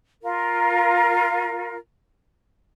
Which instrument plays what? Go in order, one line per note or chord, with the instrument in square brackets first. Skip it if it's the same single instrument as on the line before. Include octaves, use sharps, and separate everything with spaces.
[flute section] F4 A#4